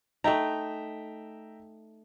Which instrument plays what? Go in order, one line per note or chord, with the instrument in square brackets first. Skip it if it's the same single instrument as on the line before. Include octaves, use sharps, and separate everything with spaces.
[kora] A3 D#4 [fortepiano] E5 G5 A#5